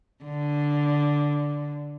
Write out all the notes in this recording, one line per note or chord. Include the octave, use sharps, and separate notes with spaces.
D3